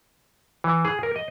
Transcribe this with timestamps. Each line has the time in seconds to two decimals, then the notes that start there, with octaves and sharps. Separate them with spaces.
0.64 E3
0.85 G#4
1.03 A#4
1.16 D#5